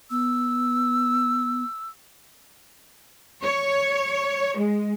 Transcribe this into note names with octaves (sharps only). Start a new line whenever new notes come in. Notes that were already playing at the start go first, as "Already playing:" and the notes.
B3 E6
C#5
G#3